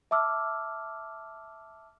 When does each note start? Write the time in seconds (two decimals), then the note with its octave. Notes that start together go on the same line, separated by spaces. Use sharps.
0.11 E5 A5 D6 E6 F6